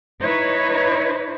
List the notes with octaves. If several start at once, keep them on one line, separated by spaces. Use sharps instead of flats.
D#4 E4 B4 C#5